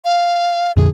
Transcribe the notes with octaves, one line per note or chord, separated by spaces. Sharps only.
F5
F2 A#2 D3 G#4